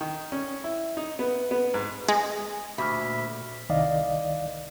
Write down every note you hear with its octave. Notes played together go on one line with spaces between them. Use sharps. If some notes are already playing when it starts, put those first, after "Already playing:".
D#3
C#4
E4
D#4
B3
B3
G#2
G#3
D2 A#2 E5 B5 C#6 F6
C2 D#3 D5 D#5 F5